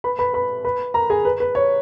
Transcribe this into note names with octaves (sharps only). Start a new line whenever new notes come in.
B4 B5
B4 B5
B4 B5
B4 B5
A#4 A#5
G#4 G#5
B4
B4
C#5